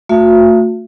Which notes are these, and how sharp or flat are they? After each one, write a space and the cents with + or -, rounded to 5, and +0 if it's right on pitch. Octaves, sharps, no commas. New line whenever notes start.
A3 +30 F#4 -40 E5 +45